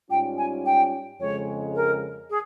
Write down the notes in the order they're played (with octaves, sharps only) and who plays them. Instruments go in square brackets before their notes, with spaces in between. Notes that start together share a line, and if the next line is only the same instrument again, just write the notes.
[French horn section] G#2 G3 C#4 F4 [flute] G5
[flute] G#5
G5
[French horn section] F2 C#3 G#3 [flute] C#5
[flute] A#4
G#4